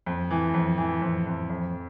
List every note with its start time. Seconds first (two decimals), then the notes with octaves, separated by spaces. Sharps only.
0.06 F2
0.31 E3
0.54 F2
0.78 E3
1.02 F2
1.26 F2
1.50 F2